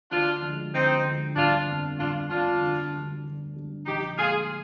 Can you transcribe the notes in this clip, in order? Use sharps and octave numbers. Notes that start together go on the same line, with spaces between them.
D2 D4 F4
D3 F3 G#3
D2 C4 D#4
D3 F3 G#3
G1 D4 F4
F2 D3
G1 D4 F4
F2 D3 D4 F4
D2
D3 G3 D4
D2
D3 G3 D4
A#1 D#4 G4
A#2 G#3 D#4 F4 G#4